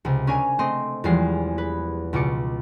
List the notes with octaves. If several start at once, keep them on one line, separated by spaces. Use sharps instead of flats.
C#2 C3
C#4 D4 A#4 G#5
A3 C4 D#5 C6
E2 F3 G3 G#3 C7
B4
C#2 B2 F4 D6 C#7